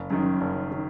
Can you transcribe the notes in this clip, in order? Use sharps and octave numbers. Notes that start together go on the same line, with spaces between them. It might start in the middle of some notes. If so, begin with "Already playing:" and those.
Already playing: F#1
F#2 D#3
F#1
D#3